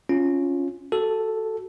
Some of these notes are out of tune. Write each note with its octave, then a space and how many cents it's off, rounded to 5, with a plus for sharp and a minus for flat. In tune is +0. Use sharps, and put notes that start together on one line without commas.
C#4 +0 F4 +0
F#4 +20 A4 +0